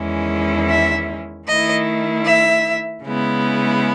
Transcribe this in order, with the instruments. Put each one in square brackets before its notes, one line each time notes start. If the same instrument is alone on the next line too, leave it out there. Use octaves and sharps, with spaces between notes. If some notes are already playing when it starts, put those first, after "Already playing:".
Already playing: [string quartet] E2 D#3 G#3 C#4 E4
E5
D#3 A3 E4 D#5
E5
C#3 G#3 B3 E4